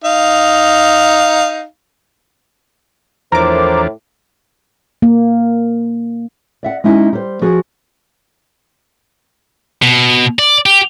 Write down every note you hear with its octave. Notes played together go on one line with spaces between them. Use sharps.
D#4 F5
E2 A2 F3 D4 A#4 C5 D6
A#3
D5 E5 F#5
G#3 C#4 D#4 E4
G3 C5
F3 F#4 G#4
B2
D5
G4